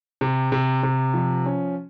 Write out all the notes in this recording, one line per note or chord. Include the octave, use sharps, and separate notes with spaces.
C3
C3
C3
F3
C#4